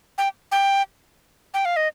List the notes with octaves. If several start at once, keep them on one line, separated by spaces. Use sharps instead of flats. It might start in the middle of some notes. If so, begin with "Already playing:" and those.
G5
G5
G5
F5
D#5